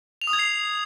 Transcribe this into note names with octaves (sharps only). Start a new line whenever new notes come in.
F7
D#6
G#6
C7